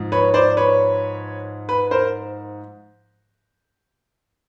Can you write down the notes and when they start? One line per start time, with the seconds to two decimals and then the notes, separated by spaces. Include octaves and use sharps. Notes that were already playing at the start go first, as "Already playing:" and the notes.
Already playing: G#2 F3
0.12 B4 C#5
0.34 C5 D5
0.57 B4 C#5
1.69 B4
1.91 A#4 C5